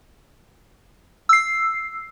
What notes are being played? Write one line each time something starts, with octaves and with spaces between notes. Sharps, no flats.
E6 C7